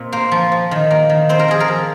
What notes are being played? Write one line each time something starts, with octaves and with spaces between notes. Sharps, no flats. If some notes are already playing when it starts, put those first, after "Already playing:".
Already playing: A#2 C4
A#3 C5
F3
F3
D#3
A#3
D#3
C4 C5
A#4
F3 G#4
A#4
F3